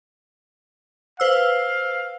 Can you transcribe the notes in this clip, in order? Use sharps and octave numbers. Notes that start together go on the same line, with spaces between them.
B4 C5 F5 E6